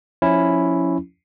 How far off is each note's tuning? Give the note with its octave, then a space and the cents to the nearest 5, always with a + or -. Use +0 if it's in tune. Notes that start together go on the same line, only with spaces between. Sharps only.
F3 +15 C#4 +0 E4 +0